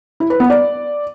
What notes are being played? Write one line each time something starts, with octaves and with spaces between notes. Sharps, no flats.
E4
B4
B3
D5